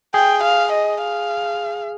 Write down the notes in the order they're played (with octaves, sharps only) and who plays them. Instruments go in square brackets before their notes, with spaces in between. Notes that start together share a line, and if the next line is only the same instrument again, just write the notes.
[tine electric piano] G#4 [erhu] G5
[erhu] F5
D#5
F5